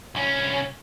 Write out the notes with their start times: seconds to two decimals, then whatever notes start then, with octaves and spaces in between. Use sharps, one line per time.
0.15 C2 C#4